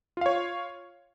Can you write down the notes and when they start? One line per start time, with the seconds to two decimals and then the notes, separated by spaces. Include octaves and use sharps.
0.17 F4
0.21 F5
0.26 C#5